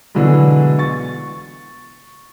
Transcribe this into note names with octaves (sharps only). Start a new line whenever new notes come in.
B2 D3 E3 F#3 G#3
C#6 A6